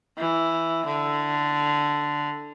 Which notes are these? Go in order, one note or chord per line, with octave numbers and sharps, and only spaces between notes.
E3
D3